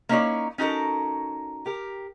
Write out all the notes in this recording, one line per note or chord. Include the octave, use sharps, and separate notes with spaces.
A#3 C#4 D#4 E4 C#5 D5
C#4 D#4 F#4 A4 A#4
G4 A#4